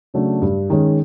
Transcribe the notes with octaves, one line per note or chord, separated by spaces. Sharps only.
C#3 F#3 A3 D4
G2
D#3 G#3 C#4